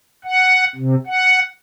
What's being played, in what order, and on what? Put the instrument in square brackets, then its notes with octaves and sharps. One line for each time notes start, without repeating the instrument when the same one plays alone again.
[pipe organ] F#5
C3
F#5